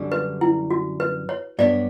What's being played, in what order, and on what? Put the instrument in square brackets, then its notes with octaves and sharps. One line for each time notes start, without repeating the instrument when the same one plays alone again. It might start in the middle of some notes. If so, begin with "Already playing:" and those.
Already playing: [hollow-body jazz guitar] F#2 D3 G3 D4
[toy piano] B4
E4
F#4
B4
C#5
[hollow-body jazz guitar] G2 F#3 B3 D4 [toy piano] D5